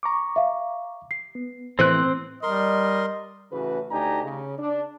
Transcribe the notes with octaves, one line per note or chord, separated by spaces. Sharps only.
A#5 C#6 D6
E5 F5
C7
B3
A2 E3 C4 C5 C6 F#6
G3 A#4 D#5 C6
A1 C#3 E3 A3 F#4 B4
D2 D4 D#4 G4 G#5 A#5
C#3
D4